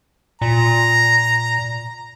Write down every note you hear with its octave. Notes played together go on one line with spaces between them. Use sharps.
A#2 A#5